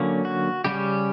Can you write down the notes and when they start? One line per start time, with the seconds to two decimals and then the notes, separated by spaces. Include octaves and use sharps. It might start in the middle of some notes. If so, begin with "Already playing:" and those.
Already playing: D3 F#3 A#3 C#4
0.25 F#4
0.65 C#3 G3 C#4 G4